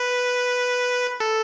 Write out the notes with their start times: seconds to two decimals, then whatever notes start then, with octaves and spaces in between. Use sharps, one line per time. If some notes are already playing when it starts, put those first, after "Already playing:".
Already playing: B4
1.20 A4